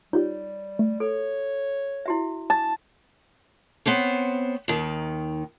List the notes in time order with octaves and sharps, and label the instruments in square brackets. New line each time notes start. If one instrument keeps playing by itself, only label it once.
[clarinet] G3 [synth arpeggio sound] D#4 F4 G4 [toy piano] C#5
[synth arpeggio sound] A3
[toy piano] A4 [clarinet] C#5
[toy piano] E4 F#4 E5
[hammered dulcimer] A5
[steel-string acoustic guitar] B3 C4 C5 C#5
D#2 D#3